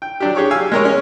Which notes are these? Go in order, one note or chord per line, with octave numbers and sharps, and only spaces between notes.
G5
F#3 D4 G4
G4 G#4 C#5 C#6 D6
F5 G#5 E6
G#3 A#4 C#5
C#4